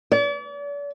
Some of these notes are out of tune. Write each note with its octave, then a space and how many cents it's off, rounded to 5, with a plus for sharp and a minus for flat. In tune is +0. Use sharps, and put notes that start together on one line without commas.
D5 -40